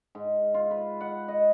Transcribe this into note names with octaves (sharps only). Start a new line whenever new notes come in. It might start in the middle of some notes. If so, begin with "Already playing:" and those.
G#2
F4
B4
F#5
D#5